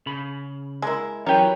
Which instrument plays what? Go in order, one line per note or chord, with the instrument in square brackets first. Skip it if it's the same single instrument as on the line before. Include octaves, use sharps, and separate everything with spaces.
[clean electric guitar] C#3 B5
[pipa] G#3 A#3 E4
[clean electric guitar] E3 F#3 B4 [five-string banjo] C#4 G4 [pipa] A#4